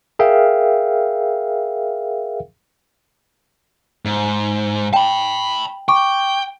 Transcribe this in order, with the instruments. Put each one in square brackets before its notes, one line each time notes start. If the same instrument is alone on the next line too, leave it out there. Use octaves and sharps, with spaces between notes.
[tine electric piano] G#4 A#4 E5 F5 G5
[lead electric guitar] G#2
[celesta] G5 [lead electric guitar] A5 B5
[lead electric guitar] G5 [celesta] C#6 D6